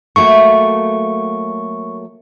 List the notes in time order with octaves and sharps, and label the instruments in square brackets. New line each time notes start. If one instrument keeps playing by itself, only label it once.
[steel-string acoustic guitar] F#3 A3 A#3 [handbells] C#6